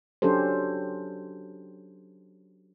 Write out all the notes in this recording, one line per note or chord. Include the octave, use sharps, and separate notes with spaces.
F#3 C#4 D4 G4 A4 C5